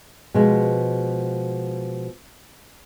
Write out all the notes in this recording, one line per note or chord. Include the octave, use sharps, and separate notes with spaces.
B2 F3 G#3